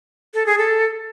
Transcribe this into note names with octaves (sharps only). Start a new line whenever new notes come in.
A4
G#4
A4